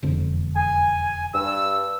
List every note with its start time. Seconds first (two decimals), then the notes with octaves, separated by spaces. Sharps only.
0.03 E1 F2 D3
0.56 G#5
1.33 G2 E6